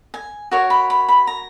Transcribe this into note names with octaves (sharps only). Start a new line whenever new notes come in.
G#5
F#4 A#4 C#5
B5
B5
B5
A#5